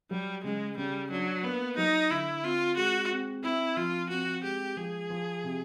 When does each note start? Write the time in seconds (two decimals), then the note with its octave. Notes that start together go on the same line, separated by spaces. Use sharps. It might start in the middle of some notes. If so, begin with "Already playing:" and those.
0.11 F#3 G3
0.44 C#3 G#3
0.77 C#3 G3
1.11 F#3 D4
1.44 A#3 B3
1.77 F#3 D#4
2.10 D3 E4
2.44 C4 F4
2.77 G#3 F#4
3.10 C4
3.43 C4 E4
3.77 F3 F4
4.10 C4 F#4
4.43 G#3 G4
4.77 F3 G#4
5.10 F3
5.44 C3